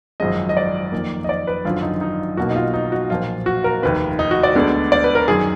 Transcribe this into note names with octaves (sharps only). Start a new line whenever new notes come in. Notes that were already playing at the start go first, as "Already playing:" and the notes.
G#1 F#2 F3 G#3 D#5
D#5
D5
F2 D#3 A#3
D#5
D5
B4
G#1 F#2 D3 F3 F4
D#4
D#4
B1 B2 A#3 F#4
D#4
F4
D#4
F#4
B1 A#2 F3 A#3 F4
F#4
A#4
F1 D#2 D#3 A#3 B4
D#4
F#4
D5
D2 D3 G#3 B3
D5
B4
A#4
F#2 D#3 G#4